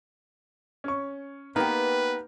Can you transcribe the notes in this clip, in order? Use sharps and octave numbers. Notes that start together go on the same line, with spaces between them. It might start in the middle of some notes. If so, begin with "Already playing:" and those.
C#4 C#6
A#3 B3 D#4 G4 A#4 B4